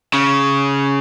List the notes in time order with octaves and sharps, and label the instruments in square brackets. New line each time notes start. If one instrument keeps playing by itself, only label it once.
[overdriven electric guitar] C#3